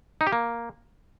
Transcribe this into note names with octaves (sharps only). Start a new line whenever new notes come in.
D#4
G4
A#3